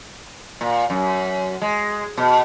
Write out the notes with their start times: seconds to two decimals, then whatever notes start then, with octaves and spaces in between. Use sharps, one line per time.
0.61 A#2
0.90 F#2
1.62 G#3
2.17 B2